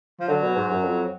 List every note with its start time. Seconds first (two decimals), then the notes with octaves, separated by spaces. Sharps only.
0.20 F3
0.28 D3 F#3
0.43 B2
0.56 G#2
0.70 F#2
0.83 F2